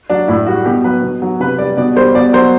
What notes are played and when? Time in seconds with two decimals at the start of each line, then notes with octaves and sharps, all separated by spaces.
0.10 F#3 D4
0.28 A2 E4
0.47 G3 F#4
0.65 B2 G4
0.84 F#3 B4
1.02 B2
1.22 F#3
1.40 C3 B4
1.58 G3 D5
1.77 B2 D5
1.96 G3 C5
2.15 B2 D5
2.33 F#3 C5